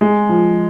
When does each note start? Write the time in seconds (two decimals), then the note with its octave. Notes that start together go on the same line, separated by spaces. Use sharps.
0.01 G#3
0.29 F3